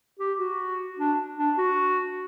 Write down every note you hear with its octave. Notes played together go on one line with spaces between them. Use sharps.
G4
F#4
D4
D4
F#4